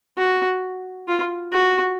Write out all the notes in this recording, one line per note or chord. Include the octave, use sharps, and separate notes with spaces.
F#4
F4
F#4